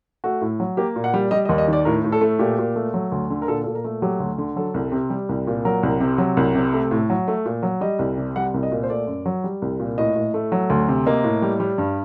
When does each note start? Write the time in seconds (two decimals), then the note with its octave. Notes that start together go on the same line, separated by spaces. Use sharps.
0.24 A3 F#4
0.41 A2
0.60 F#3
0.77 A#3 G4
0.96 A#2
1.04 F#5
1.14 G3
1.31 G3 D#5
1.45 D#5
1.49 D#2
1.58 D#5
1.68 D#3 D5
1.85 A2 A#4
2.04 A2
2.12 A4
2.21 A3
2.39 A#2 G4
2.58 A#2
2.76 A3
2.94 F#3
3.12 D2
3.30 D3
3.42 A#4
3.48 A#2 A4
3.64 A#2 A4
3.75 A#4
3.84 A3
4.02 F#3 G4
4.20 D2
4.38 D3
4.56 F#3 A4
4.74 C2
4.92 C3
5.10 G3
5.29 C2
5.47 A#2
5.65 F#3 A#4
5.83 C2
6.01 C3
6.18 F#3
6.37 C2
6.55 C3
6.73 A3
6.91 A2
7.10 F#3
7.28 A3
7.46 A#2
7.63 F#3
7.81 G3 D#5
7.99 C2
8.18 C3
8.36 G3 F#5
8.54 C2
8.63 D#5
8.72 A#2
8.83 C5
8.90 A3 D5
9.07 F#2
9.26 F#3
9.44 G3
9.62 C2
9.80 A#2
9.98 A2 D#5
10.15 A2
10.34 A3
10.52 F#3
10.70 D2
10.89 C3
11.06 A#3 D#5
11.24 A2
11.42 G3
11.60 G3
11.78 G2